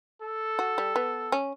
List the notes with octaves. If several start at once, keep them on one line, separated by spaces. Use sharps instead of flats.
A4
F#4
G3
B3
C#4